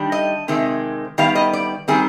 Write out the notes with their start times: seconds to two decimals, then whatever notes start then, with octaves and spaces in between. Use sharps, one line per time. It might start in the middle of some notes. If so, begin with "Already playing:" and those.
Already playing: D#3 G3 D4
0.12 D#5
0.48 C3 D#3 G#3 C4
1.18 D#3 G3 B3 F5
1.35 D#5
1.53 D5
1.88 D#3 G3 C4 G#4